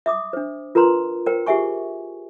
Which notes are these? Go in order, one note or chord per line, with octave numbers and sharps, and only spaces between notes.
E5 D6 D#6
D4 C5
F4 A#4 B4 A#5 C6
A#4 C5 G5
F4 G4 G#4 E5 G#5 C#6